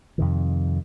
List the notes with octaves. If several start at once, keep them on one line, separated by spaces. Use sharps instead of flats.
F2 C3 D#3